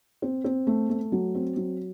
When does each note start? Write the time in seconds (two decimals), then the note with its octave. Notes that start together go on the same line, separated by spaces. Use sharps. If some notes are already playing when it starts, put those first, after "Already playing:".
0.22 C4
0.44 C4
0.67 A3
0.89 A3
1.12 F#3
1.35 C4
1.57 F#3